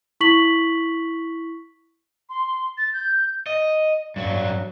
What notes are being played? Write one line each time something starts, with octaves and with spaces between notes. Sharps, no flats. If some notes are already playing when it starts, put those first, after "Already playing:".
E4 C#6 B6 F#7
C6
A6
G6
D#5
G2 F#3